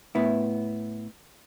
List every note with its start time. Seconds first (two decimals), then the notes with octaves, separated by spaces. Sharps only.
0.15 A2 B3 E4